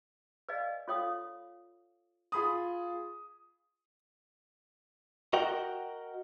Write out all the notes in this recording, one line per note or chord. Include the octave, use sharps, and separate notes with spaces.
B4 D5 D#5 F5 G#5
F4 A4 C#5 F5 G5 D#6
F4 G#4 B5 D#6
F#4 A#4 D#5 F#5 G5